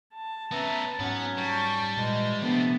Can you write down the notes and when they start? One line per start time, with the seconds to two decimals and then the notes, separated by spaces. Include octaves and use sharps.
0.15 A5
0.51 B3 C#4 B4 E5 A#5
0.99 G#2 F#3 B3 C#4 F#5
1.37 G3 A5 C#6
1.97 A#2 E3 G#3
2.42 C3 F3 A3 B3 D4 G4